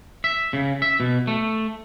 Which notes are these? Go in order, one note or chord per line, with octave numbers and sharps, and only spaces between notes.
E5
C#3
E5
B2
A3